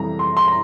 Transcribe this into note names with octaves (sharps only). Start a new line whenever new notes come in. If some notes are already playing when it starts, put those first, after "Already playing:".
Already playing: F2 C3 E3 G3 A#5
C6
C6
A#5